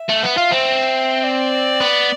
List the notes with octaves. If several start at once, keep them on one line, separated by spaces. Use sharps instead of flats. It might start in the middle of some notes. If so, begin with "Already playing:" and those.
Already playing: E5
A3
B3
F4
C4
D5
B3